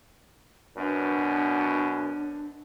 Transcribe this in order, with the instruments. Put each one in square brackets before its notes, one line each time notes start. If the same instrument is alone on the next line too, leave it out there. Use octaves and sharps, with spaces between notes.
[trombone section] F#2 B2 [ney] D4